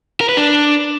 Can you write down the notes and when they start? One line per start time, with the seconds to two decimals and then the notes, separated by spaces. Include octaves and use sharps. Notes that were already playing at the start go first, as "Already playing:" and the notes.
0.21 A#4
0.29 B4
0.37 D4